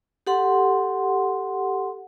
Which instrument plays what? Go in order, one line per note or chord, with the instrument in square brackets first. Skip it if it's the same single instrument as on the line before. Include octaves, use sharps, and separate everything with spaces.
[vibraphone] G4 A4 F#5 C6